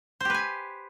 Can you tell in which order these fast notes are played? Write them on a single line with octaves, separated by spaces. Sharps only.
C5 G4 B4 G#5